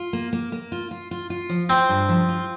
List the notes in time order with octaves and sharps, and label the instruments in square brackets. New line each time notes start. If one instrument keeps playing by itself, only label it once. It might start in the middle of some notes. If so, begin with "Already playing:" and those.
Already playing: [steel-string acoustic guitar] F4
A#3
A#3
A#3
F4
F4
F4
F4
F3
[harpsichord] C4 [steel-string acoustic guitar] F4
[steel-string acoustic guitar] G2
F3
F4